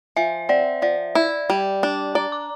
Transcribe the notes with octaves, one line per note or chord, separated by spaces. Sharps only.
F3 E5
C4 D5
F3 D5
E4
G3
D4
D5 A#5
D6